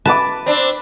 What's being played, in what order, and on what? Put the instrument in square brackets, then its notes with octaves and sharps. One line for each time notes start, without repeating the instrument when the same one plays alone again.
[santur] B4 D6 [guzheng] A5
[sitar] C4 D4